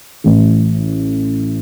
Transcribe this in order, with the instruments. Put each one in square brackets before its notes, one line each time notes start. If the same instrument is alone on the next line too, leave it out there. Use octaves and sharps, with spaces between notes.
[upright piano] A1 A2 E3